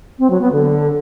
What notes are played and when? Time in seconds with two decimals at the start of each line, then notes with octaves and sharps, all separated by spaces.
0.19 C4
0.30 F#3
0.41 B3
0.52 D3